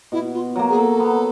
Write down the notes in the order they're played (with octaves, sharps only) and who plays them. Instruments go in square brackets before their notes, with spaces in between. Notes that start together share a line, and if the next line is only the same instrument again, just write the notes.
[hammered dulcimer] B2 [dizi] E4
[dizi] F4
[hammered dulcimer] F#3 A#3
[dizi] G#4
A4
[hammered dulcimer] B3